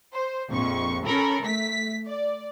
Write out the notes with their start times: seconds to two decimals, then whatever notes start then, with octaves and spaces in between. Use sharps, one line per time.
0.13 C5
0.48 A#1 F2 C#6
1.05 C#4 A4 A#4 B5
1.42 A3 B6
2.07 D5